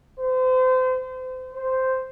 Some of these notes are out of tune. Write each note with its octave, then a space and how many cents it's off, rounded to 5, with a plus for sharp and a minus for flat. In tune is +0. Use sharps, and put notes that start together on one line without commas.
C5 -35
C5 -5